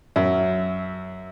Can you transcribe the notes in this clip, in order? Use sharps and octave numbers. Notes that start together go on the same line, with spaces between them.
F#2 E5